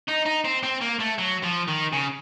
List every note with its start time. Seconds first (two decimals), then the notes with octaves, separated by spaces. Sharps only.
0.08 D#4
0.26 D#4
0.45 C4
0.63 C4
0.82 A#3
1.00 A3
1.19 F#3
1.43 F3
1.68 D#3
1.93 C#3